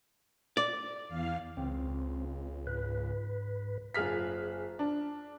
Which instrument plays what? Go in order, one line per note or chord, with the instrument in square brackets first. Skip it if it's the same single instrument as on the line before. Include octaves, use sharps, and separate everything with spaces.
[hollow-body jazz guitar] D5
[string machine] E2 F5
[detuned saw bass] C#2 [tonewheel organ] C4
[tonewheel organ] G#2 B4
[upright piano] F#1 F4 G#4 F6 B6
D4